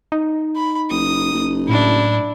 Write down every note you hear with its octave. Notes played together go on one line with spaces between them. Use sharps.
D#4
B5
F#1 D#6
F#1
A2 D4 E4